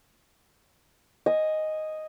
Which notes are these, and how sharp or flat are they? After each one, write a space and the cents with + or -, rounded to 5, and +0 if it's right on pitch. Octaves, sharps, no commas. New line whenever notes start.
D#5 +0 G#5 -20